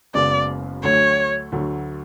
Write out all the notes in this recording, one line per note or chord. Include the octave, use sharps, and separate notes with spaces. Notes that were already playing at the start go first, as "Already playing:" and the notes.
F#1 F#2 C#3 G#3 B3 D5
D2 D3 F#3 A3 C#5
D2 D3 F#3 A3